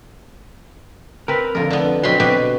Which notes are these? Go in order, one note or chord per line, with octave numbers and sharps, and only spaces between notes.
C4 A#4 B4
F2 D3 F4 A#4
D3 A3 B3
B2 F#3 C4 B5 C6
B2 G4 B4